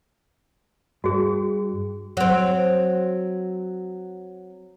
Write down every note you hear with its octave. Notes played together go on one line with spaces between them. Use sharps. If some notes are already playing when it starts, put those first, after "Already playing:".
G2 F#4 G#4
F#3 C4